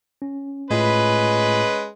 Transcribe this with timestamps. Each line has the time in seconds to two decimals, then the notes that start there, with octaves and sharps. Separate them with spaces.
0.22 C#4
0.70 A2 G#3 A3 C#4 F4 B4